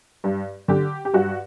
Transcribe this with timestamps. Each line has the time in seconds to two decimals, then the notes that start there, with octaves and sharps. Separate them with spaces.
0.24 G2
0.68 D3 G4
1.05 G4
1.14 G2 F#4